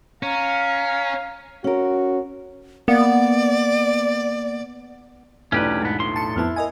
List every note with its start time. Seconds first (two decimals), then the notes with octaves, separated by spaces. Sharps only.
0.23 C#4 F5 A#5
1.64 C#4 F#4 A#4
2.88 A#3 B3 D5
5.52 B1 E2 A3 C#4 D4 G4 B4
5.82 G#2 B3
5.99 A2 C6
6.16 A5 C#7
6.36 F2 B3 E4 A5 F6
6.56 A#4 D#5 G#5